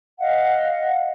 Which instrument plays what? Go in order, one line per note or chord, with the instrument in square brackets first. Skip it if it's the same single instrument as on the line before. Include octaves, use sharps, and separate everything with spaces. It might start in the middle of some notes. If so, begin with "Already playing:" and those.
[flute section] D#5 F5 F#5